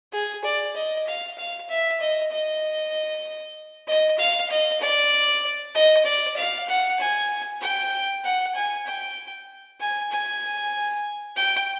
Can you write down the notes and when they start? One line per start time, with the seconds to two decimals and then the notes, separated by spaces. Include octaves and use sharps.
0.13 G#4
0.44 D5
0.76 D#5
1.07 F5
1.38 F5
1.69 E5
2.00 D#5
2.31 D#5
3.88 D#5
4.18 F5
4.50 D#5
4.81 D5
5.75 D#5
6.05 D5
6.36 F5
6.69 F#5
7.00 G#5
7.61 G5
8.24 F#5
8.55 G#5
8.86 G5
9.80 G#5
10.11 G#5
11.36 G5